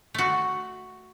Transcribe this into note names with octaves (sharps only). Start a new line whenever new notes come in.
A3 F#4